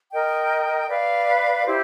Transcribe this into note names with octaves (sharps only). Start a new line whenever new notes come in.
A#4 D#5 G5
B4 D5 F5
E4 G4 C5